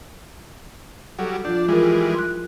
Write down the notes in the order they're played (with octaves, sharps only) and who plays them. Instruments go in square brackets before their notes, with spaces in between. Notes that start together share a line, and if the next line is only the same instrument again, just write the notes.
[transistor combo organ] F#3 G3 [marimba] A4 F#5
[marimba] F3 F4 G6 [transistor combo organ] D4
[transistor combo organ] E3 G3 G#3 [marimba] F4 G#4 A#4
[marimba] C6 F#6